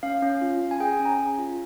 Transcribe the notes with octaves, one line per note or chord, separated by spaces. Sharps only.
C#4 F5
C#4
F4
C#4
G#5
G#4 G5
G#5
C#4
A#5
C#4
F4